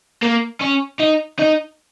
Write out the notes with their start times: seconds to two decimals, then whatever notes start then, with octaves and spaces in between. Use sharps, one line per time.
0.23 A#3
0.61 C#4
1.00 D#4
1.39 D#4